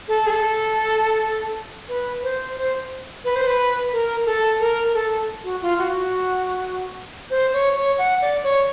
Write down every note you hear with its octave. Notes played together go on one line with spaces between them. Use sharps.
A4
G#4
A4
B4
C5
C5
B4
C5
B4
A#4
A4
A#4
A4
F#4
F4
F#4
C5
C#5
C#5
F#5
D5
C#5